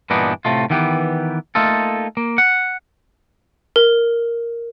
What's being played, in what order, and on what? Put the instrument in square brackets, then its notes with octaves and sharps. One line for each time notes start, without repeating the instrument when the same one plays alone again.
[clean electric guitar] G2 A#2 E3 B3 D4 D#4
A2 C3 E3 G#3 A3 F4
D#3 E3 B3 G4
A3 A#3 D#4 F4 A4
A#3
F#5
[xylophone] A#4